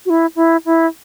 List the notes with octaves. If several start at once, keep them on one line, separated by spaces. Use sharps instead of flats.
F#4
E4
E4
E4